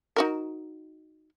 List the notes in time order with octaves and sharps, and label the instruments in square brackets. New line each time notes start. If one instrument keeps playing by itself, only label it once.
[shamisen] D#4 F#4 A#4